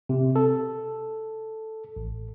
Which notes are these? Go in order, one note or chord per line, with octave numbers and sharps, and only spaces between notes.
C3
A4
A1